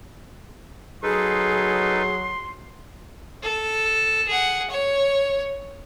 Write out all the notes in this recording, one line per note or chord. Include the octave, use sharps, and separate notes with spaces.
F#3 D#4 G#4 A4 B4 C6
A4
G#4 F#5
C#5